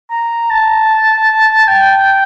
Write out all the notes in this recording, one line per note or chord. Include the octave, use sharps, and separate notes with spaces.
A#5
A5
G5